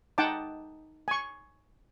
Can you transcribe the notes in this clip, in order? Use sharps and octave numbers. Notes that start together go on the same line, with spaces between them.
D#4 F#5 G5 A5 D6
G#5 C#6